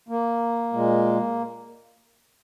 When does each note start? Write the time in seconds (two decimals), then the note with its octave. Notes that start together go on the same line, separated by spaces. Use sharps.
0.09 A#3
0.73 A#2 G#3